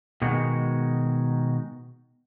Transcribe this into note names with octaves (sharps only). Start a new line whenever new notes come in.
B2 D#3 G#3 F#4